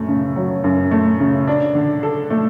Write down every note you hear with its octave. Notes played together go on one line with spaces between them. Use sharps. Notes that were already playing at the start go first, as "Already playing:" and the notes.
Already playing: F#2 A3
C#3
F#3
F#2
A3
C#3
D4
D3
A4
A3